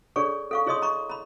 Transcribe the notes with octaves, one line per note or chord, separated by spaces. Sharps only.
D4 G#4 A4 C#5 D5 C#6
A4 F5 C#6
E4 G#4 C#5 D#5 C6 D#6
A#5 B5 C#6
A#5 B5